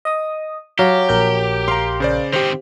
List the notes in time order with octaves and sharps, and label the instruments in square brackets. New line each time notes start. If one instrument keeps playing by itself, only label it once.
[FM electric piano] D#5 D#6
[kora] F#3 [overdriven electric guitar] G4 [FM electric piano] F5
[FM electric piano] A#1 A#4 G6
[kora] F5 [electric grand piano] A#5 C6
[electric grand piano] C#3 C5 D5
[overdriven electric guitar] D#3 C4 [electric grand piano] G4 C5